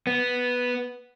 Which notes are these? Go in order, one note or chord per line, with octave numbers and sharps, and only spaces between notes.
B3